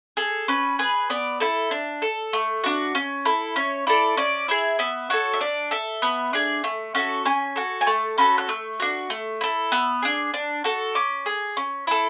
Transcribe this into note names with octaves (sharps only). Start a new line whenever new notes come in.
G#4 A4
C#4 B4
G#4 B4
B3 D5
E4 A4
D4
A4
A3
D4 F#4
C#4
E4 A4
C#4 C#5
E4 A4 D5
C#4 D5
E4 G#4 E5
B3 E5
F#4 A4 C#5
E5
D4 D5
A4 E5
B3
D4 G#4
A3
C#4 F#4 A4
C#4 G#5
F#4 A4
G#5
A3 A5
C#4 F#4 A4 B5
F#6
A3 E6
D4 F#4
A3
E4 A4
B3 E6
D4 G#4
D4
F#4 A4
C#4 D6
G#4
C#4
E4 A4